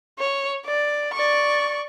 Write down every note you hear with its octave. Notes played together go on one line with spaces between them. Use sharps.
C#5
D5
D5 C#6